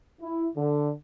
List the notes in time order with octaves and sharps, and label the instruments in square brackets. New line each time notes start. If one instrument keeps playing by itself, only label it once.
[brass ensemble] E4
D3